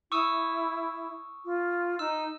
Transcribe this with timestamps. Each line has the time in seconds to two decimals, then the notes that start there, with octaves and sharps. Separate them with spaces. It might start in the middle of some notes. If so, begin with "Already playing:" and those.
0.12 E4 C#6 D#6 E6
1.45 F4
1.99 D#4 E6